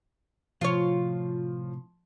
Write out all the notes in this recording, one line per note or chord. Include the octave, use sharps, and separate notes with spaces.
A2 C3 F3 F4 C#5